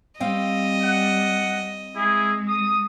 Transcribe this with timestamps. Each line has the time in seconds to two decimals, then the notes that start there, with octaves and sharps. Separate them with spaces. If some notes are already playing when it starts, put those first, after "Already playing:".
0.20 G3 C4 D#5 F5 G5
0.82 F#5
1.96 G#3 E4 G#4
2.47 D#6